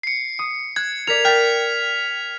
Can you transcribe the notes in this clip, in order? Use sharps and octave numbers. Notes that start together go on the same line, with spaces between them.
C7 C#7
D#6
F#6 G#6
A#4 D5 B6 F7
G5 F6 G#6 A6 B6